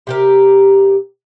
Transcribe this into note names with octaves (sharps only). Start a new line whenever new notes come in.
C3 G4 A#4